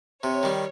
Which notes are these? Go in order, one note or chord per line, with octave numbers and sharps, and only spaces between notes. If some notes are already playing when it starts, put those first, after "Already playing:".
C3 C#5
D#3 G3